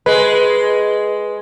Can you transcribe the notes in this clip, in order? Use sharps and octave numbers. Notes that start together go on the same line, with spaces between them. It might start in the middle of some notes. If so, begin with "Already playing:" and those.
G#3 B4